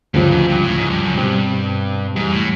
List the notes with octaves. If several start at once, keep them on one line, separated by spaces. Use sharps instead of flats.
D2 G2 C#3 F3
G#2
G2
A2
G#2
G2
F#2
G2 B2 G3 C4
F2 G#2 C3 E3 G3
A2